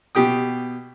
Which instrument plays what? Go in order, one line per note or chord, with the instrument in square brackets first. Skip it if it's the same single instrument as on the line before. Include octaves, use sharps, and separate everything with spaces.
[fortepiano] B2 G4 G5 D#6